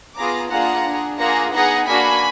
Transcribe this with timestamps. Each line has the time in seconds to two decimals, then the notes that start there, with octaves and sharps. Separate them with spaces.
0.17 B3 F4 G#4 A#5 D6
0.51 A#3 D4 F4 G#4 F#5 A#5
0.85 D4 G#4
1.19 A#3 F4 G#4 F#5 A#5
1.53 B3 D#4 G#4 F#5 A#5
1.87 A#3 D4 F#4 G#5 B5